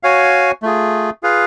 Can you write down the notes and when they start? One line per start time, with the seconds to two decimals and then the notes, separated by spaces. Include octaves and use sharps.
0.03 F#4 C#5 F5 G#5
0.63 A3 F4 G#4
1.23 F4 G#4 B4 F5